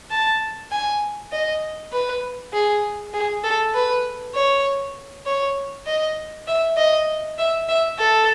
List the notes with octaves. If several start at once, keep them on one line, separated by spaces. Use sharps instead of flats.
A5
G#5
D#5
B4
G#4
G#4
A4
B4
C#5
C#5
D#5
E5
D#5
E5
E5
A4